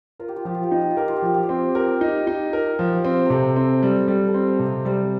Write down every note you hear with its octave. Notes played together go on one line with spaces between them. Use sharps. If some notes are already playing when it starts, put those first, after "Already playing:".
F4 A#4
G4
F4
F3 G4
F4
G4
D#4 F4
G4
F4
G4 A#4
F4
G4
F3 F4
G4
F4
C4
G4 A#4
D#4
D#4
A#4
F3
C4
C3 A4 A#4
C4
G3
G3 A4
A4
C4
F5
C3
D#5
G3 C5